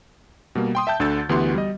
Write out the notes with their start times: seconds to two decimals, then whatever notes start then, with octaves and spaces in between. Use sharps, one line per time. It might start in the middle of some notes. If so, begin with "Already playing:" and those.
0.55 B2 G3 A#3
0.75 G5 C6 D#6
0.87 E5 G5 A5 G6
1.00 D2 D3 E6 A6
1.29 D2 E3 B3 F#4 G4 C6
1.54 G3 D#5